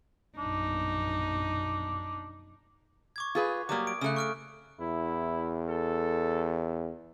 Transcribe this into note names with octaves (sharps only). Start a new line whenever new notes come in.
A#1 F#2 B2 D4 D#4
C#6 D6 G#6
F4 G#4 B4
F#3 G3 A#3 D6 D#6
D7
C#3 A3 D#6 F#6
C#6 F6 D7
E2 E4
A4